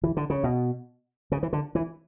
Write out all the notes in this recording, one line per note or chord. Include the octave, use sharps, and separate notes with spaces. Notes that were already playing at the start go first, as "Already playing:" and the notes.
E3
D3
C#3
B2
C#3
E3
D3
E3